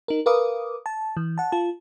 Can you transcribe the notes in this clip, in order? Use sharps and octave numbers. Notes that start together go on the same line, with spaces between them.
D#4 A#4
A#4 B4 F5 D6 D#6
A5
E3
F#5 A5
F4 A5